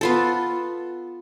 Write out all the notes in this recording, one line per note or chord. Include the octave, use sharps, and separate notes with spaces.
B3 F4 A4